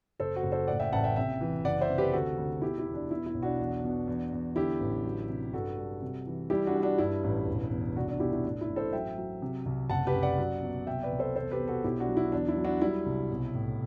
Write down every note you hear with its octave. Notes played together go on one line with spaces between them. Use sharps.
F#1 A4 C5
F#4 A4
F#1
A4 C5
A2 D5 F#5
E5 G5
A1 F#5 A5
E5 G5
C3 E5 G5
E3
F#1 D5 F#5
C5 E5
C3
G4 B4
D2 F#4 A4
D2
B2 E4 G4
E4
E2
D4
B2 E4
E4
B1
D4 F#4
E2
B2
E2
E2
D3 E4 G4
A1
F#3
C3
G2 F#4 A4
G3
C3
E3
G3 E4 G4
D4 F#4
G3
D4 F#4
G2 E4
A1
E1
E2
C2 D4 F#4
D4 F#4
B2 E4 G4
E4
A2 D4
E4
A1
A4 C5
F#3 E5 G5
F#3
C3
C2
F#1 F#5 A5
G4 B4
F#2
D5 F#5
F#3
B2
C2 E5 G5
B4 D5
C2
A4 C5
E2 A4 C5
G4 B4
B2
F#4 A4
B1 E4 G4
D4 F#4
F#3
E4
E2 D4
E4
F#3
D4 F#4
G3 E4
C2
B1
A2